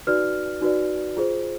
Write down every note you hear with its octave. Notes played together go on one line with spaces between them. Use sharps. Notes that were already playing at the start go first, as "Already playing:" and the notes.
D#4 F#4 B4 D5 F6
D#4 F#4 B4 D5
F4 G#4 C5